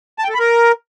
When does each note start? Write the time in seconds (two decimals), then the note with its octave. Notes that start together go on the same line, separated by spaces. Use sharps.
0.19 A5
0.24 G5
0.29 A4
0.34 B5
0.39 A#4